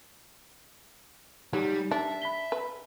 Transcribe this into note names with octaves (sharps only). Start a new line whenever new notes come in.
F#3 G3 D#4 G4
D4 E5
B5 B6 G7
B4